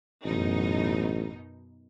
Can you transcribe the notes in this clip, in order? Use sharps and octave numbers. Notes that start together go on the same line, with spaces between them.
A1 F#2 B2 D#4